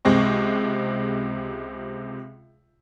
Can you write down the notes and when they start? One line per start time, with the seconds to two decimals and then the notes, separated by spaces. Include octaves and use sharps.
0.05 C#2 C3 G#3 C4 C#6